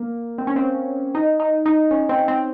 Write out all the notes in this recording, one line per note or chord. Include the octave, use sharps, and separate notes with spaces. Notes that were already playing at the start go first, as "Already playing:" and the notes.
Already playing: A#3
C4
C#4
C4
D#4
D#4
D#4
C#4
C4
C4